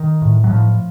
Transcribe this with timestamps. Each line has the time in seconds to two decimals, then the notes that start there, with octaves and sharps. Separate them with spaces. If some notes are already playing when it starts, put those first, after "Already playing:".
Already playing: D#3
0.22 A2
0.44 F#3
0.49 A2 F3